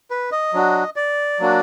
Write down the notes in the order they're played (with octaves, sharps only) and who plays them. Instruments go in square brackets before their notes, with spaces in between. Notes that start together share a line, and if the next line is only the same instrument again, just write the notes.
[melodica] B4
D#5
F#3 D4 F#4
D5
F#3 A#3 D4 F#4